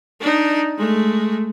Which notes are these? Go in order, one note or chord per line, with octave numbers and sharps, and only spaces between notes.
D4 D#4
G#3 A3